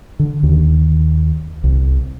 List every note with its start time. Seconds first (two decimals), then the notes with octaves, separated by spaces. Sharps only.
0.19 D3
0.43 D#2
1.64 C2